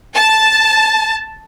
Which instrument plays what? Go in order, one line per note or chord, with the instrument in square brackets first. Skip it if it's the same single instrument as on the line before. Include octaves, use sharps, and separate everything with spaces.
[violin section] A5